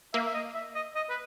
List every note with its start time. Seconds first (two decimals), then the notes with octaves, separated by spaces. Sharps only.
0.14 A#3 E5
0.26 E5
0.34 D#5
0.55 E5
0.75 D#5
0.95 D#5
1.10 B4